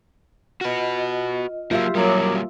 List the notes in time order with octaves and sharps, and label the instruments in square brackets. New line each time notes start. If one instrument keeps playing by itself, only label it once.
[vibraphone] F4 D#5 [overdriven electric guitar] F#4 B4
[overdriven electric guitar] F#3 A#3 [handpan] F4 E5 F5 [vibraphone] G4
[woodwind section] F#2 F#3 [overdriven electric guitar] G3 A#3 [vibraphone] D6 D#6